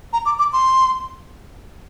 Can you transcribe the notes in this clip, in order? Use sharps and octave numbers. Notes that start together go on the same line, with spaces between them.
A#5
D6
D6
C6